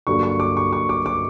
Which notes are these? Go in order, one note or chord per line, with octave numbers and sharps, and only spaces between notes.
G2 D3 F#3 A#3 C#6
C#6
D6
C#6
C#6
D6
D6